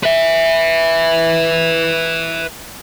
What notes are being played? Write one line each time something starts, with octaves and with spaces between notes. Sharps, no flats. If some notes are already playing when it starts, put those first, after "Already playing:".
B4 E5